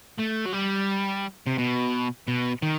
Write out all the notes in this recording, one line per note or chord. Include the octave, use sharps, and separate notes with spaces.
A3
F#3
G3
C3
B2
B2
D#3